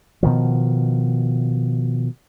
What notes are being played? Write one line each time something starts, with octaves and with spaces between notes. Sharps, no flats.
B2 D#3 F3